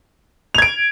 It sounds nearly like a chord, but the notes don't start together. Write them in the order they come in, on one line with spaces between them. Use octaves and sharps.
F7 G#6 D7